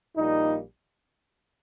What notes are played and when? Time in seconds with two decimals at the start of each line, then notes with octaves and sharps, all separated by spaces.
0.16 A#1 A#2 G3 A#3 D#4